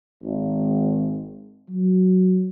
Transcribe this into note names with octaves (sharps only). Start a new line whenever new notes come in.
G#1
F#3